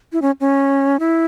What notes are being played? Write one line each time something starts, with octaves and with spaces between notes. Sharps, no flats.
E4
C#4
C#4
E4